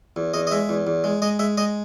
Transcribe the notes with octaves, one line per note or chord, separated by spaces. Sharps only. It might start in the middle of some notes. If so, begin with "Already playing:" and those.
E2
E2 D#5
D#5
G#3 E5
E2
E2
G#3
G#3 D#5
G#3 E5
G#3 D#5